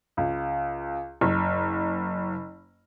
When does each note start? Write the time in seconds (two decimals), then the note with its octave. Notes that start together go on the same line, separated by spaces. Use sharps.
0.17 C#2
1.21 F#1